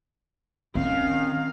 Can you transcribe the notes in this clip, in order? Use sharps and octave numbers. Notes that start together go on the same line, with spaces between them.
D#3 C4 C#4 F5